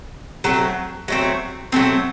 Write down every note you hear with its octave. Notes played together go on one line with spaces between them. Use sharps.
F#3 A3 C4
F#3 A3 C4
F#3 A3 C4